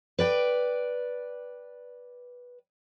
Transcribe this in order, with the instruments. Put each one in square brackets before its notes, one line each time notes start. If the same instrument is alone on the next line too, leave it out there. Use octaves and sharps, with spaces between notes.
[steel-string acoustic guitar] B4 D5 G5